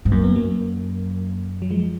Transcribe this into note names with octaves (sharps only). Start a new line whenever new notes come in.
G#2
F#2 A#3
B3
F#3 A#3
F#3
F3 G#3